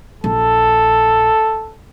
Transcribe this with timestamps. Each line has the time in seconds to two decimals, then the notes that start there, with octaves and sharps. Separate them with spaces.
0.24 A#1 A4